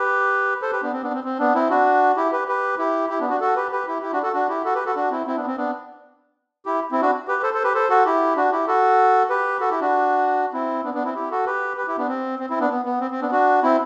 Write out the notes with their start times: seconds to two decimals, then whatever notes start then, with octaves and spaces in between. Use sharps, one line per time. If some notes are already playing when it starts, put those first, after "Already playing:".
Already playing: G4 B4
0.62 A4 C5
0.72 G4 B4
0.82 B3 D4
0.93 C4
1.03 B3 D4
1.13 C4
1.24 C4
1.39 B3 D4
1.55 C4 E4
1.70 D4 F#4
2.17 E4 G4
2.32 G4 B4
2.48 G4 B4
2.78 E4 G4
3.09 E4 G4
3.20 B3 D4
3.30 D4 F#4
3.40 F#4 A4
3.56 G4 B4
3.71 G4 B4
3.87 E4 G4
4.02 E4 G4
4.12 D4 F#4
4.23 F#4 A4
4.33 D4 F#4
4.48 E4 G4
4.64 F#4 A4
4.74 G4 B4
4.85 F#4 A4
4.95 D4 F#4
5.10 C4 E4
5.26 C4 E4
5.36 B3 D4
5.47 C4
5.57 B3 D4
6.66 E4 G4
6.92 C4 E4
7.02 D4 F#4
7.28 G4 B4
7.43 A4 C5
7.53 A4 C5
7.64 G4 B4
7.74 A4 C5
7.90 F#4 A4
8.05 E4 G4
8.36 D4 F#4
8.51 E4 G4
8.67 F#4 A4
9.30 G4 B4
9.60 F#4 A4
9.71 E4 G4
9.81 D4 F#4
10.53 C4 E4
10.84 B3 D4
10.94 B3 D4
11.04 C4 E4
11.15 E4 G4
11.31 F#4 A4
11.46 G4 B4
11.77 G4 B4
11.87 E4 G4
11.98 B3 D4
12.08 C4
12.39 C4
12.50 C4 E4
12.60 B3 D4
12.70 B3
12.85 B3
13.01 C4
13.11 C4
13.21 B3 D4
13.31 D4 F#4
13.63 C4 E4